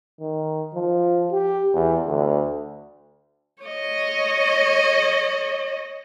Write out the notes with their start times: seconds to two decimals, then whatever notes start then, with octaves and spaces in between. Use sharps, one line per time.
0.20 D#3
0.74 F3
1.32 G4
1.73 E2
2.06 D2
3.63 C#5 D#5